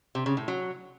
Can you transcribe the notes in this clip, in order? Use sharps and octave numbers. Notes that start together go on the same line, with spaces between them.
C3
C#3
A2
F#3